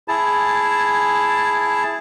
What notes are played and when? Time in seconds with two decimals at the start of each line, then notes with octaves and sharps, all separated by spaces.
0.08 E4 G#4 A5